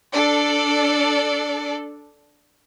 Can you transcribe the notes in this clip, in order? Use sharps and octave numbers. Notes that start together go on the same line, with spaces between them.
D4 A4 D5